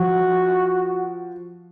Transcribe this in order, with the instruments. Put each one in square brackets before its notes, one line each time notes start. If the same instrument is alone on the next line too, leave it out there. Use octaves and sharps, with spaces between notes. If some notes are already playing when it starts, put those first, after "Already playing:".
Already playing: [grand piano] F3 [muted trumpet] F#4